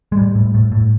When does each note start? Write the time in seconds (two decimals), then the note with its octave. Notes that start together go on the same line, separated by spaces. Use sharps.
0.12 G#3
0.17 A2 G3
0.35 A2
0.54 A2
0.72 A2